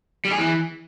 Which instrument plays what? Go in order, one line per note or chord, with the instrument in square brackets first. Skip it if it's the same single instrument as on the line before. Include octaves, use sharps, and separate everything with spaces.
[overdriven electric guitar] G3
G#4
E3